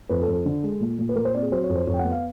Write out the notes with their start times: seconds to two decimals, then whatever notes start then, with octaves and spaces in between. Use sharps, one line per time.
0.09 F2 B4
0.22 A4
0.28 F2
0.33 A4
0.46 D3
0.63 G#3
0.81 A#2
0.99 A#2
1.09 B4
1.16 A#2 A#4
1.25 C5
1.34 C4 D5
1.42 G#4
1.52 F#3 C5
1.64 C#5
1.69 F2
1.75 C5
1.87 F2 C#5
1.94 G5
1.99 F#5
2.05 B3
2.12 F5